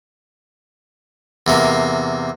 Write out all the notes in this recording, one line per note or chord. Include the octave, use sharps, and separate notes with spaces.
E2 C3 A#3